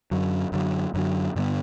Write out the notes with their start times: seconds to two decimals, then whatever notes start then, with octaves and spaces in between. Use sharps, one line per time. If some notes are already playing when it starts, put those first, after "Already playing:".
0.11 F#2 D3 F#3
0.52 F#2 D3 F#3
0.94 F#2 D3 F#3
1.36 G2 D3 G3 B3